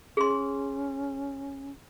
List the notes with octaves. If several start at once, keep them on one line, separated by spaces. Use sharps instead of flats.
C#4 G#4 C6